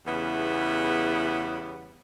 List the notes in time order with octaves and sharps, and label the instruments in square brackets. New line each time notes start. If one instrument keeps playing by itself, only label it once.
[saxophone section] E2 C#3 G3 B3 E4